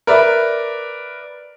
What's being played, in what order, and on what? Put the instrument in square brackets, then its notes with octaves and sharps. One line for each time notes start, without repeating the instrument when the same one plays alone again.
[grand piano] A#4 B4 D5 E5